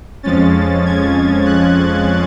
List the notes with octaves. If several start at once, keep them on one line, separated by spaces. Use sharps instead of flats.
F2 F3 G#3 C#4 A6
G#6
F#6